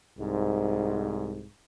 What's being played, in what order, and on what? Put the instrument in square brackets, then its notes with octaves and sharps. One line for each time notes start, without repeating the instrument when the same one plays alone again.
[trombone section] C2 G#2